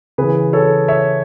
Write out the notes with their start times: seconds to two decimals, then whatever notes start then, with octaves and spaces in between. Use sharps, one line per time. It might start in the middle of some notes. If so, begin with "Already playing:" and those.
0.18 C#3 E3 G#4 B4
0.53 A4 C#5
0.88 C#5 E5